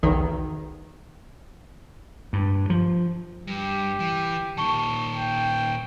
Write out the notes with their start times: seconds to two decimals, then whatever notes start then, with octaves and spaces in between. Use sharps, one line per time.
0.03 B1 E2 D#3
2.33 G2
2.70 F3
3.47 G2 G4
4.00 E3
4.57 A#2 D#3 A5 C#6 G7
5.13 G5